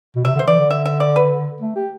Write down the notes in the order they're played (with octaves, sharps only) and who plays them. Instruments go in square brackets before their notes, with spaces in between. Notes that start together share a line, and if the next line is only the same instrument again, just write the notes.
[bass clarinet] B2
[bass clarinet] C3 [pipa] E5
[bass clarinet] D3 [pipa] C5
[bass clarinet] E3 [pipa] D5
[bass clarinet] D3
[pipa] E5
E5
D5
B4
[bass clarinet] A3
G4